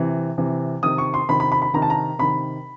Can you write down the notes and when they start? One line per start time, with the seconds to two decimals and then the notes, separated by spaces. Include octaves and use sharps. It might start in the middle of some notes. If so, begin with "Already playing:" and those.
Already playing: C3 E3
0.38 C3 E3
0.83 C3 D#3 D#6
0.98 C#6
1.14 C6
1.29 C3 D#3 B5
1.40 B5
1.52 B5
1.62 B5
1.73 C3 D#3 A#5
1.82 A5
1.90 A#5
2.19 C3 D#3 B5